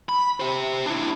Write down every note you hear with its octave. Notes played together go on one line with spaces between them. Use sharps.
B5
G4 C5
D4 E4